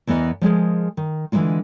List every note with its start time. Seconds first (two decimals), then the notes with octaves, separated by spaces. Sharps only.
0.07 E2 E3 B3 A#4 D#5
0.42 F3 G#3 G#4 A#4
0.97 D#3
1.32 D3 E3 F3 G#3 A#3 F4